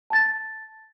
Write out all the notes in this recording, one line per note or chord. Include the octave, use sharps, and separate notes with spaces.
A5 A6